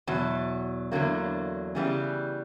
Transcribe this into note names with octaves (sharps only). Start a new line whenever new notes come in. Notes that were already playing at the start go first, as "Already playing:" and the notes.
E2 B2 F#3
E2 D3 F#3 A#3
C#3 E3 G3 B3